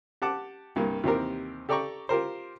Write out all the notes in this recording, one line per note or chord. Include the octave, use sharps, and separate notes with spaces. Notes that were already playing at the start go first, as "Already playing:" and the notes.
G4 F#5 A5 D6
C2 G2 A#3
D#2 C3 E3 C4 G4 A#4
G4 A4 D5 G5 A#5 C#6
F4 G4 A#4 C5